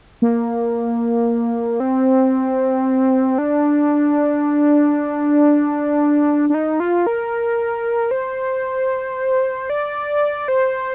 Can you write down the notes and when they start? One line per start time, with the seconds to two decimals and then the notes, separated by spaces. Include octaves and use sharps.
0.22 A#3
1.80 C4
3.38 D4
6.50 D4
6.54 D#4
6.80 F4
7.07 A#4
8.11 C5
9.70 D5
10.48 C5